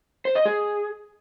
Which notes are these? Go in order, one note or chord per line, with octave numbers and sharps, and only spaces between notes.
C5
D#5
G#4